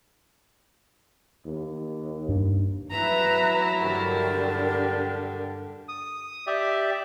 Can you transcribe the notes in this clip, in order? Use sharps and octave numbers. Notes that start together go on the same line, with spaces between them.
D#2
G2 D4
F#3 E4 B4 E5 A#5
G2 D3 D4 G4 A#4
D#6
G4 D5 E5